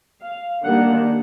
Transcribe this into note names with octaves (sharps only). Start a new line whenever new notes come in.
F5
D#3 G3 A#3 D4 F#5